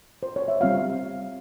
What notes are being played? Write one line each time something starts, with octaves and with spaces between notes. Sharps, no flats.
C5
C#5
E5
G3 C4 F4 F5